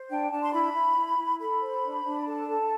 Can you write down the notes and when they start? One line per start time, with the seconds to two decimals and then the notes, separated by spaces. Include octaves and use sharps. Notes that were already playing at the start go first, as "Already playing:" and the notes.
Already playing: C5
0.09 D4 G5
0.30 D4 A5
0.42 C6
0.53 E4 B5
0.74 E4
0.96 E4
1.18 E4
1.39 A4 B5
1.61 C5
1.83 D4
2.04 D4
2.26 A4 A5
2.48 A4